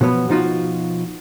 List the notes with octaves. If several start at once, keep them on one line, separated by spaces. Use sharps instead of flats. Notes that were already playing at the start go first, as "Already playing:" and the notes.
B2 F3 F#3 B3
B2 F3 D#4 F4 F#4